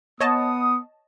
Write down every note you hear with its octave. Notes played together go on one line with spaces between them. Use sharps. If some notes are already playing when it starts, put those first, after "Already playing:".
B3 C#5 D#5 A5 D#6